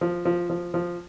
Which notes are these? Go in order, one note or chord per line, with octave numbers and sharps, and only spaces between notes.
F3
F3
F3
F3